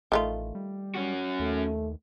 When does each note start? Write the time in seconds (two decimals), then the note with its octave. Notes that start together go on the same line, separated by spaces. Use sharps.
0.12 A1 D#3 A3 F4
0.55 G3
0.95 C#4 F#4
1.40 D#2 A3